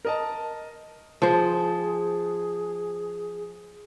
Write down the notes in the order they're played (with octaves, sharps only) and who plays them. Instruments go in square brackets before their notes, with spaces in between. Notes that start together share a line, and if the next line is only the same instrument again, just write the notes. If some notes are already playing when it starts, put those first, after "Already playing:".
[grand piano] A#4 D#5 A5
[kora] F3 C5 [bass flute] G#4